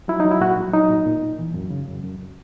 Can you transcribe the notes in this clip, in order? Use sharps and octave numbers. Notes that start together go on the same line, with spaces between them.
F#3 E4
D#4
F#3
E4
A#2 F#4
F#3
F#3 D#4
A#2
A#2
A#2
E3
F#2
C#3
F#2
F#2